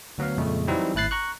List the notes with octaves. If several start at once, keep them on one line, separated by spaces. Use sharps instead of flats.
D2 F#3 B3 F5
F2 A#2 C#3 G#3 A3
E3 F#3 G3 C4 D#4 E4
G#1 A2 E4 F#6 A6 C7
A#5 C#6 F#6